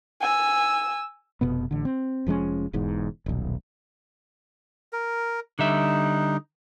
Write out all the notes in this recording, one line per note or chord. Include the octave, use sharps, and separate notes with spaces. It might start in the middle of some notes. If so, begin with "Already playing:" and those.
G#5 E6
F1 B2 B3
A1 D3
C4
F1 F3 G#3 C#4
E1 E2 G#2
D#1 B1
A#4
D3 G3 D#4 E5